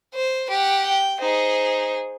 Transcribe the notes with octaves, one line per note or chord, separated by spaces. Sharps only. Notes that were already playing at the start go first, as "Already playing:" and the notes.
C5
G4 F#5
G5
D#4 G#4 C5